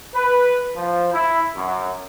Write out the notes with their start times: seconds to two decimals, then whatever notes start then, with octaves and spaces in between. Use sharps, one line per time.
0.15 B4
0.75 F3
1.13 E4
1.56 F#2